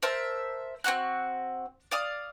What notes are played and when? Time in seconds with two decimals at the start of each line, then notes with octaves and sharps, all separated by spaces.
0.02 A#4 C5 E5 A5
0.84 C4 F4 F#4 F#6
1.91 D5 F5 D#6